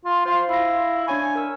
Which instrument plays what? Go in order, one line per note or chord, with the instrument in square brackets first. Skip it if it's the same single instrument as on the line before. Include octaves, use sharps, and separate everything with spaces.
[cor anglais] F4
[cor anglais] F4 [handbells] C5 F5
[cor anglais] E4 [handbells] F5 A#6
[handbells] D4 C#5 C#6 [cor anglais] G#5
[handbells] A#4 E6